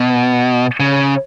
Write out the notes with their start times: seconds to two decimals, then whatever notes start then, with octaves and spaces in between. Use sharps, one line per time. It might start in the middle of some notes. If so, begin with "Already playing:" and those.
Already playing: B2
0.80 C#3